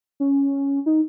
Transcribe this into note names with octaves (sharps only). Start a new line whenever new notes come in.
C#4
D#4